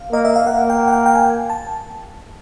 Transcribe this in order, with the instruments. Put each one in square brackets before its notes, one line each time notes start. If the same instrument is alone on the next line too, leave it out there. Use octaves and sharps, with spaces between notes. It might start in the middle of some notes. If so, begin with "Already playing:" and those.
Already playing: [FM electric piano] F5
[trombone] A#3 [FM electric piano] D#5
[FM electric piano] E5
F5
[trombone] A#3 [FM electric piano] F#5
[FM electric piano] G5
F#5
G5
G5
G#5
A5